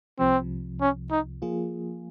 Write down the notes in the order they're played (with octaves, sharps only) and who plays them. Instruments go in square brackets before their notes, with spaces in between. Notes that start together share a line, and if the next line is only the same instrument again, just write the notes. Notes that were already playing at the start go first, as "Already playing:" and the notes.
[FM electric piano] C2 C3 F3 [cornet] C4
[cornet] C#4
D#4
[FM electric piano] F3 A#3 F4 G#4